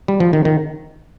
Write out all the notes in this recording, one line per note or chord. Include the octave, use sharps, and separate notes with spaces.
G3
F3
D#3
D#3